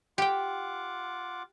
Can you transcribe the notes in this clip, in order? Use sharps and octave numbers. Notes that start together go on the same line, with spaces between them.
F4 G4 F#5 G5 D6